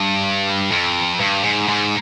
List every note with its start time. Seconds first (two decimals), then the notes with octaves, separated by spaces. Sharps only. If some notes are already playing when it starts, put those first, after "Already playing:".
Already playing: G2
0.72 F2
1.20 G2
1.44 G#2
1.69 G#2